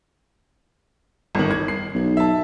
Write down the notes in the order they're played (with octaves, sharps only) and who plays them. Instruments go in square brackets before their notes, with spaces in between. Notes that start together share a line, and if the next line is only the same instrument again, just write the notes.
[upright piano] G1 D#3
G#6
C7
[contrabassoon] B1
[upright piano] E5 A5